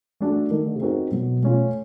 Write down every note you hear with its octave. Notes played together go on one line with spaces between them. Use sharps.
A3 D4 F#4 A4
D#3 A3
D3
C3
C#3 C4 D#4 F#4 A#4
B2 F#3
A3 C#4 F4